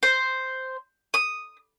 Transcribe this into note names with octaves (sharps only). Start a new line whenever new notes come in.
C5
D#6